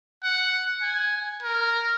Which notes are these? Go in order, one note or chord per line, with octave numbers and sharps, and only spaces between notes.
F#5
G#5
A#4